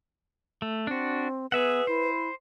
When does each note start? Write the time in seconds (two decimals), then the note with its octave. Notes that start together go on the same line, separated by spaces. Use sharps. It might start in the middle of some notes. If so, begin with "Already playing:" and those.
0.62 A3
0.87 C4 D4 F#4
1.52 B3 G#4 B4 E5 F#5
1.87 E4 C5